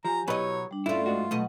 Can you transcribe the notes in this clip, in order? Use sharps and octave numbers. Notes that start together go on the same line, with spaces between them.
F3 G4 G#5 A#5
B2 F#3 E4 G4 B4 C#5 D#5
G3 D4
G2 A3 C#4 E4 F4 A4 D5
G#2 D4 F#4 D#5
B2 F#3 A3 D#5 F#5